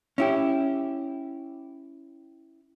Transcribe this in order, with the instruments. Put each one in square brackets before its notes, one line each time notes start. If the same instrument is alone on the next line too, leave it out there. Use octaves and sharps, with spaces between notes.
[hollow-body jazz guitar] C#4 E4 G4